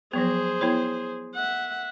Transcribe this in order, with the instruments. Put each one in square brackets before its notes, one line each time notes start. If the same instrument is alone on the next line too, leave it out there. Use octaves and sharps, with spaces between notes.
[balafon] F3 F#3 B3 [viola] G#4 C5
[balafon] B3 E4 C#5
[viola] E5 F#5